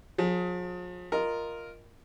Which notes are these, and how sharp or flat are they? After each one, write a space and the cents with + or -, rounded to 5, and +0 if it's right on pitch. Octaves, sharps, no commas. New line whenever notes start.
F3 +45 G#4 +15
F4 +0 A#4 +0 D#5 +0